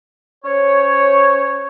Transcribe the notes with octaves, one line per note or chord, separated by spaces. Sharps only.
C#4 C5 C#5